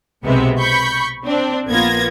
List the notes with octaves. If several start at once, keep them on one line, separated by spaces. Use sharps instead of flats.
B1 C3 G#3 B3 C4 E5
B5 C#6 G6
C4 D4
A#1 A#3 B3 F4 G#6 A#6